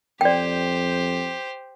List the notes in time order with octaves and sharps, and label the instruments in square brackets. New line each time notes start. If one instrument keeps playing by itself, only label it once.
[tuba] F2 [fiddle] G4 C5 [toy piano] D5 G5